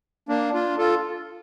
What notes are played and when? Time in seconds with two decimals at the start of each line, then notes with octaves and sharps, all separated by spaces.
0.29 A#3 D4
0.54 D4 F4
0.78 F4 A4